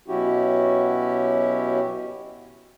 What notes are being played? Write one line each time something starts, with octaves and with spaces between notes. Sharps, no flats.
B2 F#3 C#4 E4 F#4 G4